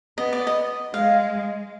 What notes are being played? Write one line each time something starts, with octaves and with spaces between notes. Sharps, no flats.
B3 D#5
D5
D#5
G#3 F5